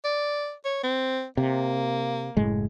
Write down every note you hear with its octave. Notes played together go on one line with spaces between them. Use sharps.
D5
C#5
C4
C3 A#3
F#1 A2 G#3